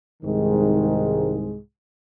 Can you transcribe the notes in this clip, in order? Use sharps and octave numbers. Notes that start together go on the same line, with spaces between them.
C2 G#2 D#3 G#3